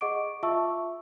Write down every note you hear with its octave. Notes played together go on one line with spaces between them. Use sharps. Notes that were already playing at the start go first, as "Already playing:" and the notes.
G#4 D#5 F#5 C#6 D6 D7
F4 E5 A5 C#6 E6